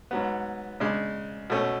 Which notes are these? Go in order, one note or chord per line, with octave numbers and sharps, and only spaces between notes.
G#2 F#3 B3
C#3 G#3 D4
B2 A3 C#4